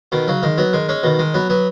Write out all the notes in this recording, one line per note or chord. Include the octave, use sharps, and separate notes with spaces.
B2 D#3
C#3 F#3
D#3 G#3
F#3 B3
D#3 G#3
G#3 C#4
B2 D#3
D#3 G#3
F#3 B3
F#3 B3